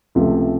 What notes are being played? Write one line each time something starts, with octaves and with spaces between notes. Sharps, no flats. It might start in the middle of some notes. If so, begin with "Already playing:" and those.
C#2 C3 F3 A3